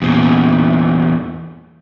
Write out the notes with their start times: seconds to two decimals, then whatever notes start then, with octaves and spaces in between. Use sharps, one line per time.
0.02 E2 A#2